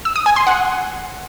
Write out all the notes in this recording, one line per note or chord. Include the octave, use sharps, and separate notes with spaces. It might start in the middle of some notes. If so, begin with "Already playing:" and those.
E6
D#6
G#5
C6
F#5